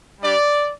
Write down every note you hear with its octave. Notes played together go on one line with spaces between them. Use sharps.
G3 D4 G4 D5